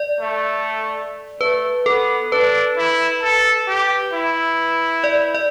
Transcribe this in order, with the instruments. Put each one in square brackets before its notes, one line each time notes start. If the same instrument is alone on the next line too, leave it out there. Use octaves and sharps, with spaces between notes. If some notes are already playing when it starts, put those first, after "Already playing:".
Already playing: [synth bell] D5
[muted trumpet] A3
[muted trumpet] A3 [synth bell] B4
[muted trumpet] B3 [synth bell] A4
[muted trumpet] D4 [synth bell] B4
[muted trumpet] E4
A4
G4
E4
[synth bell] D5
D5